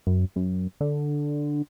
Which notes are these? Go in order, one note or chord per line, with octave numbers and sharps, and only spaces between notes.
F#2
F#2
D3